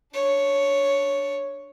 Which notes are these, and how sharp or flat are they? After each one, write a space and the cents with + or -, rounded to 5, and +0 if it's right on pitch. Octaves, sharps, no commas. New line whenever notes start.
D4 +0 C#5 +0